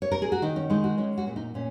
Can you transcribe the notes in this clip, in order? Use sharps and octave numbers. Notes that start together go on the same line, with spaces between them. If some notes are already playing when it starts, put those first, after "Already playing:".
C#5
A#4
G#4
F#4
D#3 D#4
C#4
G#3 D#4
F#4
C#4 D#4
F#4
A#2
D#4
A#2 C#4